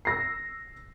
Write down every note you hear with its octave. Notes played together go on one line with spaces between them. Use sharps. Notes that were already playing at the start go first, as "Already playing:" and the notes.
E6 A#6 C7